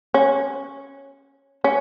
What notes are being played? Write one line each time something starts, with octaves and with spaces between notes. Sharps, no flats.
C#4
C#4